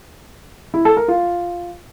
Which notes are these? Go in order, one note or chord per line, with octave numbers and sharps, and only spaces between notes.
E4
A4
A#4
F4